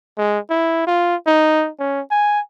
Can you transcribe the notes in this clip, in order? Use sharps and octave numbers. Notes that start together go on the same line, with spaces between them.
G#3
E4
F4
D#4
C#4
G#5